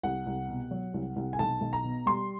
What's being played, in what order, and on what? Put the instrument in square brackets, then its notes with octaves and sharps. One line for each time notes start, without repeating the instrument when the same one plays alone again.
[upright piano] C2 F#5
C2
B2
F#3
C2
C2
G#5
B1 A5
B1
A#5
B2
G3 C6